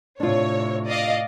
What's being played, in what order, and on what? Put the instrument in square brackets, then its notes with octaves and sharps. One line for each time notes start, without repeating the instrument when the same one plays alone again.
[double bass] A2 C3 [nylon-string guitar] D4 F4 [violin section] C#5
[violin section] D5 D#5 F5